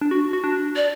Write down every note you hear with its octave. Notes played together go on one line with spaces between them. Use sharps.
D4
F#4
F#4
D4
D5